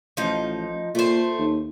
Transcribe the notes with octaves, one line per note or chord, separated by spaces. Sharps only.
A1 F3 D#4
A#2 A3 C5
D#2